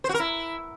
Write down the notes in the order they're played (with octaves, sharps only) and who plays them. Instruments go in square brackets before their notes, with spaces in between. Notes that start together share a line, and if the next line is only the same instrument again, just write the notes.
[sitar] C5
F#4
A#4
E4